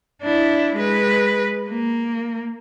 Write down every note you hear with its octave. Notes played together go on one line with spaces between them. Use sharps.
D4 E4
G#3 B4
A#3